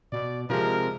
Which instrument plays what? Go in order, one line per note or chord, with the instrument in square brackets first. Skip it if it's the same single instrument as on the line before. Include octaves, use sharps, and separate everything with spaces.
[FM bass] B2 [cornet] D5
[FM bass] C3 [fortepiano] F3 G#3 [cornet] A#4